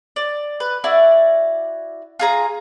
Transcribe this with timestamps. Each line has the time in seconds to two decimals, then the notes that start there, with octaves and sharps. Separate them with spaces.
0.16 D5
0.60 B4
0.84 E4 F#4 D5
2.20 F4 G#4 A#5